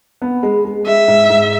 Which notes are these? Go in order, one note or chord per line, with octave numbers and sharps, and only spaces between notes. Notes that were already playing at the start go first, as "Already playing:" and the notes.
B3
G#3
G#3
G#3 E5
G#2
G#2